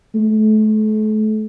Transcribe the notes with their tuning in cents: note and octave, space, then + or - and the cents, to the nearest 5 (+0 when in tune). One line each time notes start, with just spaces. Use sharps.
A3 -35